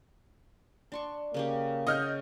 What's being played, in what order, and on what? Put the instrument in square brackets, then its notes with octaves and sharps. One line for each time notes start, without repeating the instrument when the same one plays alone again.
[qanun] D4 C6 C#6
[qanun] C#3 C#4 G4 [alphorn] A#3
[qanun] C#3 F#5 [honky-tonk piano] D#5 F6 G6